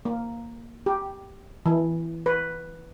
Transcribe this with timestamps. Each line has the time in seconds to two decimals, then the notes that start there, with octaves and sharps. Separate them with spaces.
0.05 A#3
0.86 G4
1.66 E3
2.26 B4